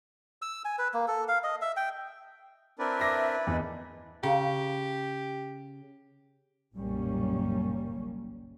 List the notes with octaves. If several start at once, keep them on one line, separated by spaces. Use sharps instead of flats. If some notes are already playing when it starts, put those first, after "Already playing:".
E6
G#5
B4
A#3
A4
F5
D#5
E5
G5
C4 D4 E4 A#4 B4 D5
E5 D6 A#6
E2 D#5
C#3 G4
F#1 B1 A#2 G3 A#3 C#4